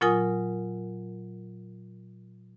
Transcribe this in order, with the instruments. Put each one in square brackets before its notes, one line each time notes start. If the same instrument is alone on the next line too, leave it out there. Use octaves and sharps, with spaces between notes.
[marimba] A#2 F#3 F4 A#4 G#5 D#6